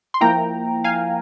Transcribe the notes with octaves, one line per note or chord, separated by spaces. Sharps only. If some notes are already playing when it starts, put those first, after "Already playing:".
C6
F3 A#3 E4 G5 A#5
F5 G#5